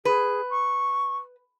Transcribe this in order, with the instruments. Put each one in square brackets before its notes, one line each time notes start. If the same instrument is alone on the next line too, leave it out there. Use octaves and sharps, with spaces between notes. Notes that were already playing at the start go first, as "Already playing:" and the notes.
[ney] G#4 [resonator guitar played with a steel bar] B4
[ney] C#6